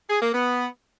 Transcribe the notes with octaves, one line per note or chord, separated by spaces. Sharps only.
G#4
A#3
B3